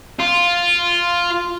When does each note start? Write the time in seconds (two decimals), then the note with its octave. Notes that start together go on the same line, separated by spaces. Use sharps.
0.19 F4